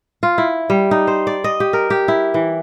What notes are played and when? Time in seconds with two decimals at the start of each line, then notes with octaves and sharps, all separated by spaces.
0.23 F4
0.38 E4
0.70 G3
0.91 D#4
1.07 C5
1.27 D5
1.44 D#5
1.60 G4
1.73 A#4
1.90 G4
2.08 E4
2.34 E3